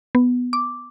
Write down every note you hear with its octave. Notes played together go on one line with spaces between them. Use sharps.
B3
D6